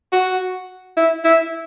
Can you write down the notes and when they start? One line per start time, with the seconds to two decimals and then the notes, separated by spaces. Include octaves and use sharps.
0.12 F#4
0.97 E4
1.24 E4